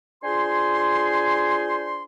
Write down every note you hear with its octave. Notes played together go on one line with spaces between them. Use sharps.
D4 F4 G#4 C5 G#5 C6